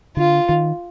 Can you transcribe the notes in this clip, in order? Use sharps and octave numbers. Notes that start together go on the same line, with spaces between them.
D3 F4
D#3